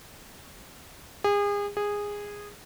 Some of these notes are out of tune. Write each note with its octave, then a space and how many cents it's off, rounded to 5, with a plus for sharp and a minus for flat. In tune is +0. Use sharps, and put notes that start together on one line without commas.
G#4 -35
G#4 -15